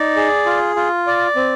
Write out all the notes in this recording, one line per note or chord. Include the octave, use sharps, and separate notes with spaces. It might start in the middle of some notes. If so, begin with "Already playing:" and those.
Already playing: D#4 D5
G#4
F4
F4
D5
C4